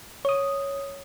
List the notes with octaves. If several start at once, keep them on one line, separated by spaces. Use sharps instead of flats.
C#5 D#6